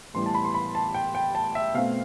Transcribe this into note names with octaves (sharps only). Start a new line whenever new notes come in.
A2 E3 G3 B3 C6
A5
B5
C6
B5
A5
G5
G5
A5
E5
B2 A3 C4 F5